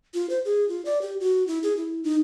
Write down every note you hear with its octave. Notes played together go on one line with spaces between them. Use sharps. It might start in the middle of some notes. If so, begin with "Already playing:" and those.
F4
C5
G#4
F4
D5
G4
F#4
E4
G#4
E4
D#4